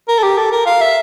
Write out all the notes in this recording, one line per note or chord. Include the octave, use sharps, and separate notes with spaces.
A#4
A4
G4
A4
A#4
F5
E5